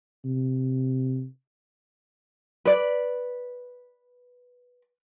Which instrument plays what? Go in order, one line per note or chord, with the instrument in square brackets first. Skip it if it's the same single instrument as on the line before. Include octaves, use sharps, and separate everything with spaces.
[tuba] C3
[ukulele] B4 D5